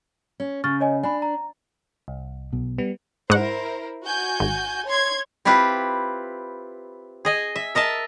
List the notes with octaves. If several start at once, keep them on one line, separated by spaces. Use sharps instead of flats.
C#4
C#3 C#6 F6 A6
C#5 D#5 G#5
D4 G#5 B5
A#5
C2
B1 B2
G3 B3
G#2 E4 A#4 C5 F#5
F#4 G#5 G6
G#1
C#5 C6 G#6
C4 E4 F4 G4 B4
G#4 D#5 G#5
E5
A#4 D#5 E5 A5